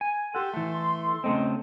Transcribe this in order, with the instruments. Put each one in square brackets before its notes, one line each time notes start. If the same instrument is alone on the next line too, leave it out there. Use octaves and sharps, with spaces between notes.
[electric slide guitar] G#5
[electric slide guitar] G4 F#5 [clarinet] A4 [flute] C6
[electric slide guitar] E3 A3
[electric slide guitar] C#3 A3 C4 [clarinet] D#5